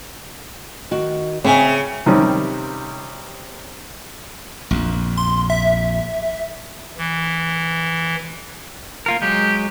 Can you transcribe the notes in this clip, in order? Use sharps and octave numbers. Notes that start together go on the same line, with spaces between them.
D#3 F#4
C#3 C4 E5 G#5
C3 D#3 G3 C#4
A#1 F2
C6
E5
E3
A#3 F4 A#4
F#3 G#3 G4